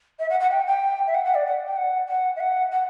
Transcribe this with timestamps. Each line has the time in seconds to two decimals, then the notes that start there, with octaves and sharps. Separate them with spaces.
0.19 E5
0.30 F#5
0.40 F#5
0.51 G5
0.66 G5
1.07 E5
1.14 F#5
1.25 F#5
1.34 D5
1.46 F#5
1.66 G5
1.76 F#5
2.08 F#5
2.36 E5
2.40 F#5
2.72 F#5